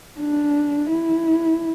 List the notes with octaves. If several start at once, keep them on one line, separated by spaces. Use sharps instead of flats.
D4
E4